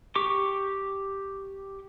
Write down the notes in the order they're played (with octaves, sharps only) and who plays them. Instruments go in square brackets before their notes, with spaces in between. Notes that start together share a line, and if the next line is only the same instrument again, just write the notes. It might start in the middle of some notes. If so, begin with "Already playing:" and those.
[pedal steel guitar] G4 C#6 D6